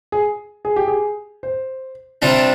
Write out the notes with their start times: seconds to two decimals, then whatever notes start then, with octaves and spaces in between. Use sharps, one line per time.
0.12 G#4
0.65 G#4
0.76 G4
0.88 G#4
1.43 C5
2.22 C3 G3 D4 F4